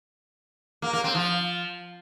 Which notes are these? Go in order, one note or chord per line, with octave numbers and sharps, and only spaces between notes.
A#3
A#3
C4
F3